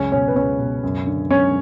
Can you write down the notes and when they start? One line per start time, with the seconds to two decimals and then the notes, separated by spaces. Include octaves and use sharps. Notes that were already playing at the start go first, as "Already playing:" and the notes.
Already playing: C#2 F#2 C#4 C#5
0.12 B2 C#4 C#5
0.28 B4
0.36 C#2 C#4 C#5
0.59 B2
0.83 F#2
1.07 D3
1.30 F#2 C#4 C#5